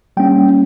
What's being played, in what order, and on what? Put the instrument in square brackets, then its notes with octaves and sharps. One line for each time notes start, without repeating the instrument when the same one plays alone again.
[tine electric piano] G3 A#3 C#4 G5